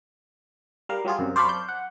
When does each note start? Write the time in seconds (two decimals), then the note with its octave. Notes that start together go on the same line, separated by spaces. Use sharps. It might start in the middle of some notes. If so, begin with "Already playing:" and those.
0.89 G3 A#4 F5
1.05 F#3 G3 F4 G#4
1.19 F#2 C3
1.36 C5 D5 F5 A5 B5 C#6
1.49 G6
1.69 F#5